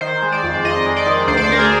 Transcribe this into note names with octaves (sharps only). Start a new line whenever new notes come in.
D#3 C5
G#3
D5
F2
F2 D#5
G#3
D5
D#3
D2 C5
D5
C5
D2 A#4
G#4